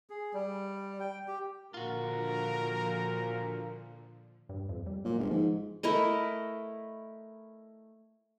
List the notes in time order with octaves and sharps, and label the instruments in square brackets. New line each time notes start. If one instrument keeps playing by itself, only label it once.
[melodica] G#4
G3
G5
G4
[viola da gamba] A#2 [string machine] D3 F3 [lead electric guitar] F4 F#4 [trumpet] A#4
[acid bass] G2
F2
G3
[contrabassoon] A#2 [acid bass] F#3
[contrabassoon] G1 [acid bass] G#3
[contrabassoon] G#2 [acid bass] F3
[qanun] A3 E4 A#4 D#5